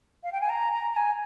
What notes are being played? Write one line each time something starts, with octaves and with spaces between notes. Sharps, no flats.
F5
G5
G#5
A#5
A#5
A#5
G#5